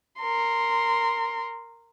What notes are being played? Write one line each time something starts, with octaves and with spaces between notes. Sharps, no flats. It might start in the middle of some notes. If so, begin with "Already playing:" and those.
A#4 C6